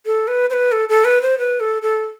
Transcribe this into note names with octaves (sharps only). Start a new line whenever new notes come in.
A4
B4
C5
B4
A4
A4
B4
C5
B4
A4
A4